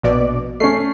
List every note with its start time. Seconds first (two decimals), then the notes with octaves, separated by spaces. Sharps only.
0.03 A#1 B2 D5
0.60 A3 C#4 C7